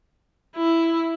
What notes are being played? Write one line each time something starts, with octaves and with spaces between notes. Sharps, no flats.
E4